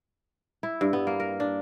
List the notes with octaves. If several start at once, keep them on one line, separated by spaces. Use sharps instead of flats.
E4
G2
B3
A#3
A#4
D4